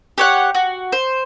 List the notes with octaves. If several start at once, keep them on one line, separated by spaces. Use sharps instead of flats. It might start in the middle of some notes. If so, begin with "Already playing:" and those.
G4 C#5 F#5
F#4
C5